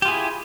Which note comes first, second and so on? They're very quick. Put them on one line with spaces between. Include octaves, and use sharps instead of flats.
G4 F4 G#4 E4